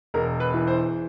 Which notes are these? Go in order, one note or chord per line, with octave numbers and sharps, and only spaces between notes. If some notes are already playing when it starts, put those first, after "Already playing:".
E1 A#4
B4
E3
C5